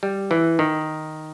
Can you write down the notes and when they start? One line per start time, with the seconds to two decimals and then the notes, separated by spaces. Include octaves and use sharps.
0.03 G3
0.31 E3
0.59 D#3